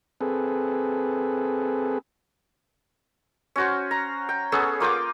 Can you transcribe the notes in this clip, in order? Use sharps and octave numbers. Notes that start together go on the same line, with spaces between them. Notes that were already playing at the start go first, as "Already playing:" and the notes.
C4 G#4 A4 B4
C#4 F#4 C5
A#5
G5
B3 C#4 G#4 A4
A#3 F4 G5 D6